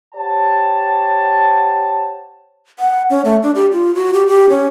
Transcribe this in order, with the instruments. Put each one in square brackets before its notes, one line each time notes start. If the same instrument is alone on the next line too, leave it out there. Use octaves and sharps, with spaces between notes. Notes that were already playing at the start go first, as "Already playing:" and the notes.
[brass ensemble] G4 C5 C#5 F#5 A5
[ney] F#5
C#4
A3
D4
G4
F4
F#4
G4
G4
C#4